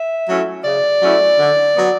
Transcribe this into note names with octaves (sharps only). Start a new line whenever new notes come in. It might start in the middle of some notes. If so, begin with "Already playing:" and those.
Already playing: E5
F#3 A3 C#4 E4
C#3 D5
F#3 A3 C#4 E4
D3
F#3 B3